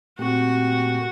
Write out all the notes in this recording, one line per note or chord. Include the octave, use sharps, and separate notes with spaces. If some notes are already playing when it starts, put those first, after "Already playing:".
A#2 A3 C4 F#4 G4